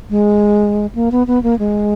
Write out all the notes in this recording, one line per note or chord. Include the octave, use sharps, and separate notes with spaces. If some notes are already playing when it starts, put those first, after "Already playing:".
G#3
A#3
B3
B3
A#3
G#3